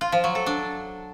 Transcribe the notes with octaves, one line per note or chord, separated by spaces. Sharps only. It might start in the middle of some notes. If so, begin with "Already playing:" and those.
F4
F3
F#3
A4
D4